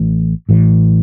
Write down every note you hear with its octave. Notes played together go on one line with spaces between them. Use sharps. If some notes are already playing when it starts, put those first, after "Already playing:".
Already playing: A1 A2 E3
A1 A2 E3